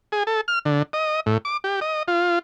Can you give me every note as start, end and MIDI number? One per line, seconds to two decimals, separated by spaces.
0.12 0.23 68
0.27 0.41 69
0.48 0.59 89
0.65 0.83 50
0.93 1.20 75
1.26 1.38 45
1.45 1.57 86
1.64 1.80 67
1.81 2.03 75
2.08 2.39 65